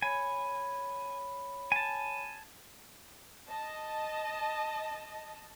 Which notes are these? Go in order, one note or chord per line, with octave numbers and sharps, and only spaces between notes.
C#5 G#5 B5
G#5 A5
D#5 A5